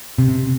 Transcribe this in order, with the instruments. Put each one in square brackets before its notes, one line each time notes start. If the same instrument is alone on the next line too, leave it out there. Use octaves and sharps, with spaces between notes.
[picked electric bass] C3